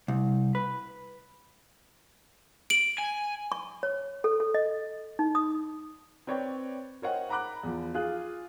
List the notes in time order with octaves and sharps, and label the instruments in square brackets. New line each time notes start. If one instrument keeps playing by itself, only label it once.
[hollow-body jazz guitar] C2
B4
[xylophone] D7 F#7
[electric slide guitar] G#5
[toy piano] C#6
C#5
A4
A4
D#5
D#4
D#6
[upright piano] C4 B4 C#5 D5 G5
A#4 C5 C#5 D#5 F#5 G5
F#5 A#5 B5 D6 F#6
E2 F3
F4 G#4 F5 F#6